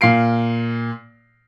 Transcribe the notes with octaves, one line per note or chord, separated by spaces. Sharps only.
A#2 F5 C7 D7